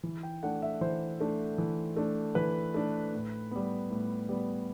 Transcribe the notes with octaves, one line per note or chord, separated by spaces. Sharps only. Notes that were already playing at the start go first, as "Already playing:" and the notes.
E3
G5
A3 D4 F#5
E5
E3 C5
A3 D4
E3
A3 D4
E3 B4
A3 D4
A2
G3 B3
A2
G3 B3